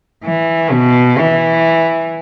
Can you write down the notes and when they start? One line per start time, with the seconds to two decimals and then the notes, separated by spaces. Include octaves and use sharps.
0.24 E3
0.71 B2
1.18 E3